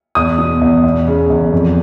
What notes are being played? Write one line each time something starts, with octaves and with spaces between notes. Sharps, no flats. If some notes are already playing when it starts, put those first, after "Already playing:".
E2 D#6
B2
E2
E2
C#3
E2
F2